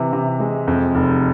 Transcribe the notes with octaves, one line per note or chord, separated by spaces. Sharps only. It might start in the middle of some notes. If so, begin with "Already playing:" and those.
Already playing: C3 E3
C3
G#3
F2
F1